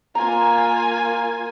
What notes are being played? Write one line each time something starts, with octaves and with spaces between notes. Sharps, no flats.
A#3 F4 G#5 A#5